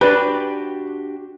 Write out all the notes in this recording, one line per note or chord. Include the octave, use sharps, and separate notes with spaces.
D4 F#4 G4 B4 D5